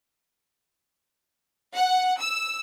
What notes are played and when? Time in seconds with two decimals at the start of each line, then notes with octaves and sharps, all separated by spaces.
1.75 F#5
2.20 E6